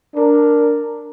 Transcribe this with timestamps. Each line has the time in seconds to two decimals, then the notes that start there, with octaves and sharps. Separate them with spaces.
0.16 D4 A#4